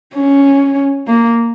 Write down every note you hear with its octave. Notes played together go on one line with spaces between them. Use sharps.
C#4
A#3